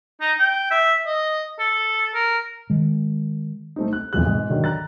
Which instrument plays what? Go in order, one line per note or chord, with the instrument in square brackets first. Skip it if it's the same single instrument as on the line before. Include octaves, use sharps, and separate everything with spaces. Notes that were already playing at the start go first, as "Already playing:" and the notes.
[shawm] D#4
G5
E5
D#5
A4
A#4
[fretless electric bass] D#3 G#3
[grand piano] A3 C4 D#4
F#6
B1 F2 E3 F3 G#3 F#6
G#2
D3 D#3 F#3
A#5 F#6 A6